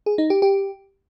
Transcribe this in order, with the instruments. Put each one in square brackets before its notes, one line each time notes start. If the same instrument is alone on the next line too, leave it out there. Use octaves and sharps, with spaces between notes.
[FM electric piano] G#4
D#4
G4
G4